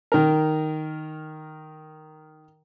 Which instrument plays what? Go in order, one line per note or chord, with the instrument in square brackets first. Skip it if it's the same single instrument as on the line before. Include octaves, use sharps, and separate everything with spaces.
[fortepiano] D#3 A#4